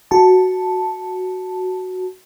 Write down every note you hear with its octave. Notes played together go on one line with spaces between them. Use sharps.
F#4 A5